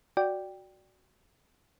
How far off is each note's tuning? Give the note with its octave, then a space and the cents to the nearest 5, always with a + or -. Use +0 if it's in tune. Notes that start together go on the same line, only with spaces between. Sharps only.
F#4 +0 D5 +0 G5 +0